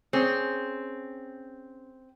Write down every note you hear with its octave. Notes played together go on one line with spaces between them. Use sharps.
C4 C#4 G#4